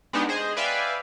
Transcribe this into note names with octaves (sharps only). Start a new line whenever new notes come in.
G#3 B3 D4 D#4 G4
G#4 C5 D#5
B4 D5 E5 F5 G5 G#5